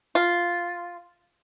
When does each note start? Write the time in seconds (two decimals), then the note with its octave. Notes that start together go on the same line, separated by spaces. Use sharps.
0.15 F4